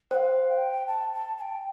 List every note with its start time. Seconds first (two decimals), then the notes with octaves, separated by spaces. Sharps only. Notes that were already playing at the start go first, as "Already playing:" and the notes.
0.11 C5 F5 G5
0.49 G5
0.87 A5
1.13 A5
1.37 A5
1.41 G5